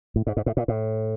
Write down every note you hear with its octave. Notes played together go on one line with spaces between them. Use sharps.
A2
G#2
G#2
A2
A#2
A2